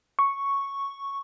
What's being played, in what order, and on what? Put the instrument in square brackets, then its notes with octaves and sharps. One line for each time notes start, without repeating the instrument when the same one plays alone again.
[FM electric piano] C#6